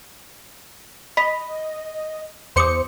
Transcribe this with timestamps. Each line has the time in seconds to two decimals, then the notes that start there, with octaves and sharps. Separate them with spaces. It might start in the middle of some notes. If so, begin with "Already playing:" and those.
1.17 D#5 B5 B6
2.56 E2 C5 C6 D6 D#6 C#7